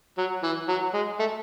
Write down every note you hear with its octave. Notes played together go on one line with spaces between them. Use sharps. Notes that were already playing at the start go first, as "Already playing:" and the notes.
F#3
E3
F#3
G#3
A3